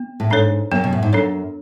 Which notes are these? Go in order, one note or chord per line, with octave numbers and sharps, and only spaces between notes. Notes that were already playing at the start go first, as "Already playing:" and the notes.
Already playing: B3
A2
G#2 D4 A4 C#5
F#2 B3
B2
A2
G#2
F#2 D4 A4 C#5